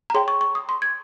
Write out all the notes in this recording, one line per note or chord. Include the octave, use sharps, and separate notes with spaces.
A#5
G#4 C#5 G5 C6
C#6
C#6
D#6
C6
G#6